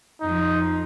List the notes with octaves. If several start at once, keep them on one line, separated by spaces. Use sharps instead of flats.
F2 F3 D#4